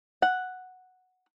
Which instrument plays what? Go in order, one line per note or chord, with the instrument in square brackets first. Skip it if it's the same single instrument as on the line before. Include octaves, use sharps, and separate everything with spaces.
[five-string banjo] F#5